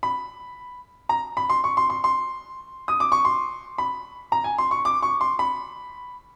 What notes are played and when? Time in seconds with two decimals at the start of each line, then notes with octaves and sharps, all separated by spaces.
0.03 B5
1.09 A#5
1.37 B5
1.50 C6
1.64 C#6
1.77 C6
1.90 C6
2.04 C6
2.88 D#6
3.00 D6
3.12 C#6
3.25 C6
3.78 B5
4.32 A#5
4.44 G#5
4.58 C6
4.71 C#6
4.85 D6
5.03 C#6
5.21 C6
5.39 B5